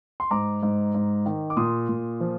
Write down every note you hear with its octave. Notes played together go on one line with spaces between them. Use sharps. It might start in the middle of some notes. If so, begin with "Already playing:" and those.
C6
G#2 A#5 D6
G#2
G#2
D#3
D6
A#2 C6 D#6
A#2
F3